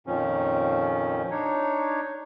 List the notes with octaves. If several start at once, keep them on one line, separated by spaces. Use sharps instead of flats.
F2 A#2 D#3 F3 C#4
D4 D#4 C#5